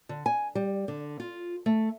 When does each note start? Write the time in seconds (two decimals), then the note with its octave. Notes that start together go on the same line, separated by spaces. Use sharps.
0.09 D3
0.26 G#5
0.55 G3
0.88 D3
1.20 F4
1.66 A3